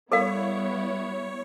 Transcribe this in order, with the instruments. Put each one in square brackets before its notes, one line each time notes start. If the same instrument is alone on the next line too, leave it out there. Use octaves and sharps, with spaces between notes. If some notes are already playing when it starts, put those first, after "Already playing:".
[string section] G3 B3 E4 [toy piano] A4 A#4 F5 [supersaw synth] C#5